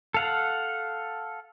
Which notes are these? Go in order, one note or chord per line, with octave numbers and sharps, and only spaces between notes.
A4 F5 F#5